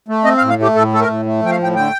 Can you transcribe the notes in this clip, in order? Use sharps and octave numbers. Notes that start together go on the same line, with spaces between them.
A3
C4 D#5
F5
A2
F5
A3 G4
A2 A4
A3 A4
A#4
A2
A3
F3 G5
F5
A2 G5
D3 G5